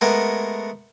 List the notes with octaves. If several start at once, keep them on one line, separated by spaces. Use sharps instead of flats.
G#3 A3 B3 A#4 F#5 G#5